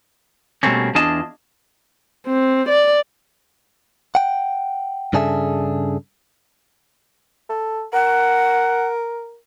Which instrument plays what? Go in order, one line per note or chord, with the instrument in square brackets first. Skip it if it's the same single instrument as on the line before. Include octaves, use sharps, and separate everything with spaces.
[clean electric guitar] B2 G3 A3 A#3 C4 C#4
E2 D4 F4 G#4 D#5 A5
[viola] C4
D5
[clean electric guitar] F#5 G5
G2 C#3 D4 G#4 A4 E5
[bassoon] A4
[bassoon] A#4 [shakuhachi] F#5